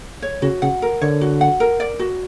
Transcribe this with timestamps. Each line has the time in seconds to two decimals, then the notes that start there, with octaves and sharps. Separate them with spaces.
0.22 C#5
0.42 C#3 F#4
0.62 C#3 F#5
0.82 A#4
1.01 D3 C#5
1.21 F#4
1.41 F#5
1.60 A#4
1.80 D5
2.00 F#4